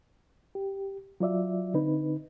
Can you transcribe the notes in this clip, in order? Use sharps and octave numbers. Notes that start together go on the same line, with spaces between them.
G4
F#3 F4 D5 E5
D3 C4 D#4 B4